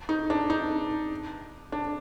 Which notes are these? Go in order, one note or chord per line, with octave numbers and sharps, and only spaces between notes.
D#4
D4
D#4
D4